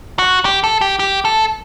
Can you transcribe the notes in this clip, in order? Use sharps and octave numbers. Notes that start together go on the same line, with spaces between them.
F#4
G4
A4
G4
G4
A4